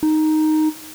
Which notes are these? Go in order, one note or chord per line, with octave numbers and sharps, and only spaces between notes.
D#4